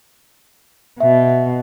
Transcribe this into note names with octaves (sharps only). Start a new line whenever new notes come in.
B2 E5